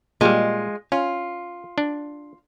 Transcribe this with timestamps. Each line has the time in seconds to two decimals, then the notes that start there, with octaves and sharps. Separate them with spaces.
0.21 A#2 G3 G#3 F4
0.92 C#4 F4
1.78 D4